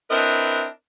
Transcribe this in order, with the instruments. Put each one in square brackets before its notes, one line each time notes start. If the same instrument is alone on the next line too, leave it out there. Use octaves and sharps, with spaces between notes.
[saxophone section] C4 D4 E4 A#4 B4 D#5